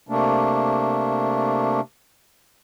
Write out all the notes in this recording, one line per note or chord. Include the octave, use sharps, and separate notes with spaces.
C3 A3 A#3 D4